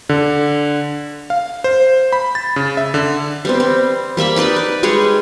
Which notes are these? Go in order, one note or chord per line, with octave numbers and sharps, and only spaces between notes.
D3
F5
C5
B5
A6
C#3
E5
D3
G3 B3 C4
C4
G3 A#3 E5 B5
D#4 B4 D5 D#5
B4
G3 G#3 G#4 C#5